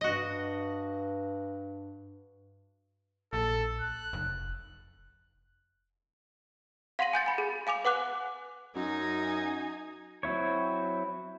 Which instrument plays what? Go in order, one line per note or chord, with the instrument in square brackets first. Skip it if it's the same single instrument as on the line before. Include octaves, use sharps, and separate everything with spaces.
[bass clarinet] G2 [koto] F#4 D#5
[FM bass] A#1 [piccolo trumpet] A4
[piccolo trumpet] F#6
[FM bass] F1
[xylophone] F5 F#5 C6 A#6 D#7 F#7
G#5 G6 A6 C#7
G#5 B5
G#4
F5 G#5 D6 F7
B4 F#5 D6 F#6
[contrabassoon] F#2 [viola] D#4 G#5
[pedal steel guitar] F#3 C4 E4 C#5